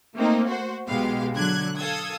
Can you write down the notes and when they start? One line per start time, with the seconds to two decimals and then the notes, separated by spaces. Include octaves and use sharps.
0.16 A3 A#3 C4 D#4
0.47 F#4 C5
0.87 B1 B2 G#3 B3 G4 F5
1.35 D3 F#3 F#6 G#6
1.76 A4 F5 D#6 E6 G#6